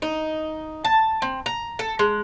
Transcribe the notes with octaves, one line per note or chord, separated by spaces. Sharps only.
D#4
A5
C4
A#5
A4
G#3